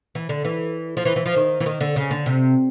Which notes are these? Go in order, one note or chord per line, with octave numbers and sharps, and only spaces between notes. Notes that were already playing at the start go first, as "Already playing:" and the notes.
E3
D3
E3
F3
E3
E3
F3
D#3
E3
D#3
D3
C#3
D3
C3